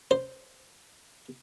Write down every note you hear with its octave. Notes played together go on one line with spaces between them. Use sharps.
C5